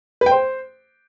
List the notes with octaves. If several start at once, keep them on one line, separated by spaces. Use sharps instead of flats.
B4
G5
C5